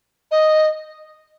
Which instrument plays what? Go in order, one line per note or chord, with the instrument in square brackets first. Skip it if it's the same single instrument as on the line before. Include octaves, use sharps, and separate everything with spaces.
[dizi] D#5